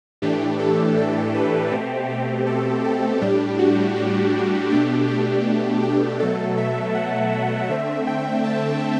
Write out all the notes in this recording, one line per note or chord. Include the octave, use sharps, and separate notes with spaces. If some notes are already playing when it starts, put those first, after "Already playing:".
A2 E3 A3 D4 G4
A4
A4
B4
B2 A3 C4 G4
G4
A4
A4
A2 G3 D4 G4
F#4
G4
B2 A3 D4 G4
G4
G4
B2 F#3 A3 A4
E5
F#5
F#5
D3 A3 C4 E5
G5
A5